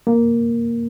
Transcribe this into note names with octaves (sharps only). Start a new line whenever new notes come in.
A#3